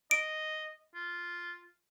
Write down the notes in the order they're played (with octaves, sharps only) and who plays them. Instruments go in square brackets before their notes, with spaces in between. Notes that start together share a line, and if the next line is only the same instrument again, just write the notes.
[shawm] D#5 [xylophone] D7
[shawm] F4